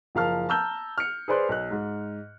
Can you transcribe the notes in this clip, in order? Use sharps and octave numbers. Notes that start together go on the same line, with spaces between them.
F#1 F3 A#4 F5 A5 F6
A5 A#5 E6 F6 G6 G7
F6 C#7
G#4 B4 C5 D5 C6 F#6
B1 F#6
G#2